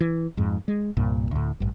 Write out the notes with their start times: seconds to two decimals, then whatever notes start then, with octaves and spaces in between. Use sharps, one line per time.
0.01 E3
0.37 F2 G#2
0.68 G#3
0.97 C2 G2 A#2
1.31 D2 A2
1.60 A1 G2